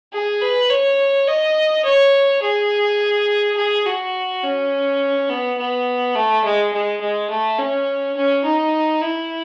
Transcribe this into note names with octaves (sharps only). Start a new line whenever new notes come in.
G#4
B4
C#5
D#5
C#5
G#4
G#4
F#4
C#4
B3
B3
A3
G#3
G#3
G#3
A3
C#4
C#4
D#4
E4